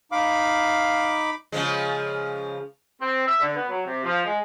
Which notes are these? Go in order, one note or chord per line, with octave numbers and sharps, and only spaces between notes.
D#4 F5 B5 D6
C#3 F3 G#3
C4
E5
D3
B3
F#3
C3
F3
G#3